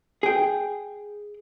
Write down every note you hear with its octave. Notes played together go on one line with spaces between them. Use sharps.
G#4 G5